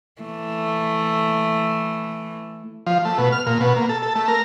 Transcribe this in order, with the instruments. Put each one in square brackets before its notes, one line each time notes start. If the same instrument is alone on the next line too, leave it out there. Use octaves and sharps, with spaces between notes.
[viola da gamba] E3 A3
[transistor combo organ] F3
A3
B2
F6
A#2
B2
A#3
A4
A4
A3
A#4